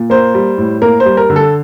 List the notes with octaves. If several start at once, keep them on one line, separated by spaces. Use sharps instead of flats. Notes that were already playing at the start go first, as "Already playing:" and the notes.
Already playing: A#2
A#3 C5
G3
A2
A#3 A#4
C5
G3
A#4
D3
A4